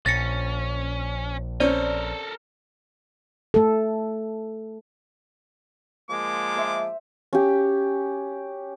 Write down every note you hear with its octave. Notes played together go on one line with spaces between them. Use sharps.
A#1 C#4 A6 A#6 C#7
C4 C#4 A4 A#4 D5
A3 A4
F3 G#3 A#3 D6
C5 E5
C#4 G4